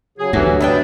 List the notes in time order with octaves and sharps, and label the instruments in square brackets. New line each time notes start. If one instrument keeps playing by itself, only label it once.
[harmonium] C#3 F#3 [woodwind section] G#4
[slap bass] D2 G2 [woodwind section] E3 [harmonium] F#3 A3 A4 [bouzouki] F#4
[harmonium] F#3 [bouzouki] B3 E4 G5 [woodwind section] D4